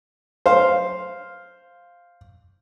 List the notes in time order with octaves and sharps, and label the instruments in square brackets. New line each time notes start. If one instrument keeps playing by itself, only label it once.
[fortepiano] C5 F5